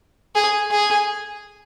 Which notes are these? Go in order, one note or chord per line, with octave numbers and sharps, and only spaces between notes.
G#4
G#4